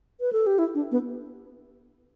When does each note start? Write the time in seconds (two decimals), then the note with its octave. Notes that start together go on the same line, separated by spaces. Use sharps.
0.21 B4
0.33 A4
0.47 G4
0.59 E4
0.75 D4
0.91 B3